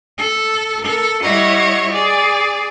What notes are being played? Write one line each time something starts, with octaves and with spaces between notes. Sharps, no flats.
A4
A4 A#4
G3 E4 C#5 D#5 F#5
G#4 D5